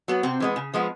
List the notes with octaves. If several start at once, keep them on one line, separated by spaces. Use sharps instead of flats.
F#3 B3
C3 C4
E3 G#3 B3
C#3
F3 G#3 B3